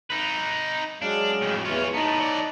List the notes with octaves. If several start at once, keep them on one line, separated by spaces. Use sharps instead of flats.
D#4 B4
F#3 G#3 D4 F5
F2 A2
E2 E3 C#4 F4
A2 B3 D#4 A5 A#5
F#3 D5